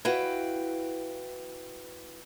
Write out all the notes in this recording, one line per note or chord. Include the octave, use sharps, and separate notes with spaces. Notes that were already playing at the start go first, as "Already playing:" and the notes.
E4 F#4 B4 F5 G5